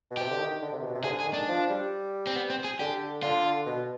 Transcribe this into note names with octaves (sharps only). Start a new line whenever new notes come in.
B2
C3 G4
D3
D#3
D3
C3
B2
C3
D3 G#4
G#4
D#3
D4
F3
G3
C4
B3
C4
G#4
D3 G4
D3 F4
B2